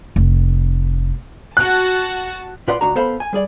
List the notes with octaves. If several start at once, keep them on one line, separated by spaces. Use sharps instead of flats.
F1
F#4 A5 F#6
A#2 F4 B4 D5 F#5 C6
C#2 D4 F#4 A#5
B3 A4 C5 F5 B5
G#5
G3 G#4 D5